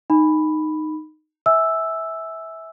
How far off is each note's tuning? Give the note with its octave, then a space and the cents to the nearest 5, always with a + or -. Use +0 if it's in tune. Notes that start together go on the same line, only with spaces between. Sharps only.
D#4 -10 B5 +0
E5 -20 G#5 +0 E6 +0